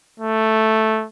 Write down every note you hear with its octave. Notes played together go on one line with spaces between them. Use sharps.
A3